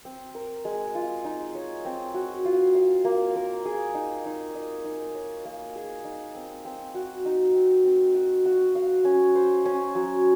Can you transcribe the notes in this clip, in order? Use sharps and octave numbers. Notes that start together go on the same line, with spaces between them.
C4
A#4
G#3
F4
D#4
C#5
C4
F#4
F4
F5
A#3
A#4
G#4
D#4
D#4
D#5
D#4
C#5
A#3
G#4
D#4
C4
C4
F#4
D#4
C4
C4
F#4
F#4
F5
C#4
C5
C#4
F#3